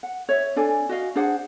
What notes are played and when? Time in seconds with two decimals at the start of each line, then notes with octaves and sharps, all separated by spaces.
0.03 F#5
0.29 C#5 E5
0.56 D4 A4 D5 G#5
0.89 F#4 D#5 F5
1.15 D4 G#4 C5 F#5